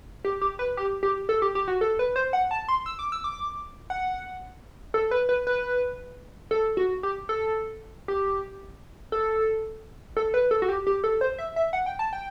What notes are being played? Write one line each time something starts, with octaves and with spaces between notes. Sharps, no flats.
G4
G4
B4
G4
G4
A4
G4
G4
F#4
A4
B4
C5
F#5
A5
C6
E6
D6
E6
D6
F#5
A4
B4
B4
B4
A4
F#4
G4
A4
G4
A4
A4
B4
A4
F#4
G4
G4
A4
C5
E5
E5
F#5
G5
A5
G5